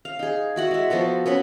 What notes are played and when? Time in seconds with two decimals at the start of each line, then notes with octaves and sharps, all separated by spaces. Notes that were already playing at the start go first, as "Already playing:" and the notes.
0.05 F5
0.19 D#4 G#4
0.56 E4 F#4 F#5
0.71 G#3 E5
0.90 F3 B3 F#4 A4
1.26 B3 C#4 B4